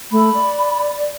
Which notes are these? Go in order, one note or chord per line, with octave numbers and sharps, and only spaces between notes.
A3 B5
D5